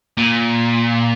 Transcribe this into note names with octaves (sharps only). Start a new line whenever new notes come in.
A#2